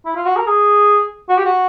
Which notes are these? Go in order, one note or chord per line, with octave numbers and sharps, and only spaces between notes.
E4
F4
F#4
A#4
G#4
F#4
G4
F#4